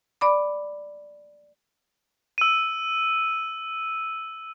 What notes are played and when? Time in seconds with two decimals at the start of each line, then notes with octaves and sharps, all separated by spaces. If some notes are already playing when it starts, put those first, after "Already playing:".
0.21 D5 B5 D6
2.38 E6 D#7